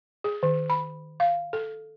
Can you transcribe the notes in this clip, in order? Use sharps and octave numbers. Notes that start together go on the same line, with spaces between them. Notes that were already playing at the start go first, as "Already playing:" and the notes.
G#4
D#3
B5
F5
A4